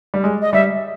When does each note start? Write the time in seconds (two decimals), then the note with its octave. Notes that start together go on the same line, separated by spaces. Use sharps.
0.14 G3
0.24 G#3
0.41 D#5
0.53 G3 E5